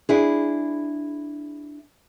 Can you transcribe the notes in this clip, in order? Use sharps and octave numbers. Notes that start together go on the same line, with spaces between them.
D4 E4 G#4